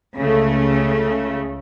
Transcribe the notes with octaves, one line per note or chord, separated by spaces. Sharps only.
C#2 C#3 A3